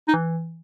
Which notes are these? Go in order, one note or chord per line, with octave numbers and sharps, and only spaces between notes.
D#4
E3